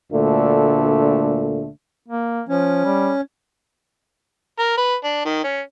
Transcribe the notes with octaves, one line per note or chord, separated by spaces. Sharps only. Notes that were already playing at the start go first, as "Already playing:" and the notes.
D2 A#2 D3 A3
A#3
F3 C#4
G3
A#4
B4
D4
D#3
C#4